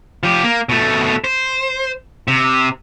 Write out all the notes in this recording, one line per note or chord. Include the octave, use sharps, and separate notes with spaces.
F3 G4
A#3
B2 A3
C5
C3